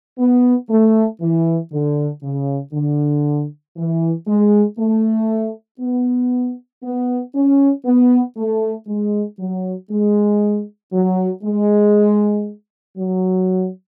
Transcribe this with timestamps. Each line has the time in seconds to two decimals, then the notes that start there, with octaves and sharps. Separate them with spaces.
0.19 B3
0.70 A3
1.21 E3
1.72 D3
2.23 C#3
2.74 D3
3.77 E3
4.28 G#3
4.79 A3
5.80 B3
6.83 B3
7.35 C#4
7.86 B3
8.37 A3
8.87 G#3
9.39 F#3
9.91 G#3
10.93 F#3
11.44 G#3
12.97 F#3